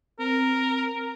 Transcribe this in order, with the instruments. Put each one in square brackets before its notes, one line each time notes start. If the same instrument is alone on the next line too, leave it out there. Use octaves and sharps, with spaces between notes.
[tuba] C4 [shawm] A#4